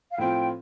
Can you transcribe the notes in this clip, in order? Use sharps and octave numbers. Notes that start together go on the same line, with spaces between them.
F5
A2 F3 C4 F4 G5